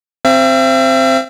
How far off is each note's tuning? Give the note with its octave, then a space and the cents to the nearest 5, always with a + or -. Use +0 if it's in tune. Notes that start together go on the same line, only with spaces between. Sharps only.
C4 +0 E5 +45